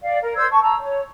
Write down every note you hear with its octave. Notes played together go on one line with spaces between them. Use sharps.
D5 F5
A#4
C5 D5 E6 G#6
A5 C#6
A5 A#5 E6
C#5